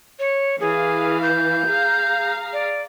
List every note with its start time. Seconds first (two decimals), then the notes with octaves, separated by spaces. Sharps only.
0.19 C#5
0.60 E3 G#4 F5
1.23 G6
1.67 G#4 F5 A#5
2.53 D5